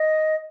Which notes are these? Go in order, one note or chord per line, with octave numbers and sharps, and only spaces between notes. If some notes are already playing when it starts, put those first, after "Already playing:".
Already playing: D#5